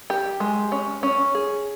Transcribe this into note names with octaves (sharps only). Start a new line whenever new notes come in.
G4
G#3
C#4
C#4
G#4